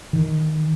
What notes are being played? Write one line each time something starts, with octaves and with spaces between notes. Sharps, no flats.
D#3